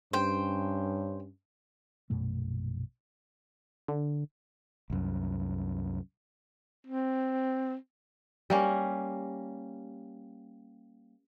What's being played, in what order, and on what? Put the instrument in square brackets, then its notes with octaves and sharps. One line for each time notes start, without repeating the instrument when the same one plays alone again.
[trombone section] G2 C#4 [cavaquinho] C5 G5
[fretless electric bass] A#1 F#2 B2 A3
[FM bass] D3
[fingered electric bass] C2 F#2
[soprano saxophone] C4
[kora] G3 A#3 C#4